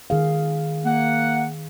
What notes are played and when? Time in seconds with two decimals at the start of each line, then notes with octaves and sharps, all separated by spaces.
0.10 D#3 G#4 F5
0.85 A#3 F#5